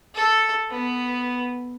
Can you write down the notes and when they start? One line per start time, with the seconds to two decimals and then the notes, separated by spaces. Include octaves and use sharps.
0.15 A4
0.71 B3